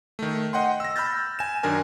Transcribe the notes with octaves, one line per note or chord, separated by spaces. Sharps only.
D#3 A3
D#5 F#5 G5 C6
E6 A#6
B5 E6 F6 G6 A6
G#5 E7
F#2 D#3 D4 A#4 G#5